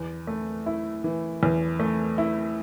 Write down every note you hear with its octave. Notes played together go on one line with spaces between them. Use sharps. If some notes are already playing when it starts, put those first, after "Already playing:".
Already playing: E2
A3
E4
E3
E2
A3
E4